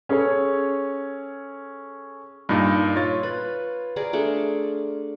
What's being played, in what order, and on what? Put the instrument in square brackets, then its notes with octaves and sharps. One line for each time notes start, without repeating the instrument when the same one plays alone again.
[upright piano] C#4 G#4 A4 C#5
[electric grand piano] G2 A#2 D#4
F4 C#5 A6
[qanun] B4
G#4 A#4 D5
A3 D4 G#4